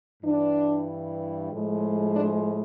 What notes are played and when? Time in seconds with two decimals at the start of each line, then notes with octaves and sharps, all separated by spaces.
0.23 G2 E3 G3 D4
1.51 A2 F3 G#3
2.14 D4